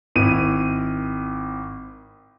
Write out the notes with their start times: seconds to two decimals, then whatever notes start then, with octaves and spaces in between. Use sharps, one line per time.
0.15 G#1 E4 D#7